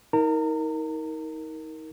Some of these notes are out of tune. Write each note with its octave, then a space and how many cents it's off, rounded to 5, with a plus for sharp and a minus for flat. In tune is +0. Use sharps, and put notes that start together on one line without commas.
D#4 +35 A#4 +0 A#5 -40